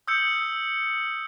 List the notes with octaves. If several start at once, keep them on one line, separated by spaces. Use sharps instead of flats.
D#6 E6 G6 C#7